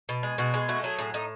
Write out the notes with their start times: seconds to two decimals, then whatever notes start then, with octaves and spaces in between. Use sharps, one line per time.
0.09 B2
0.23 G#3
0.38 B2 F#4
0.54 G#3
0.69 A3 F#4
0.84 F#3 G#4
0.98 A2 G#4
1.14 A2 D#4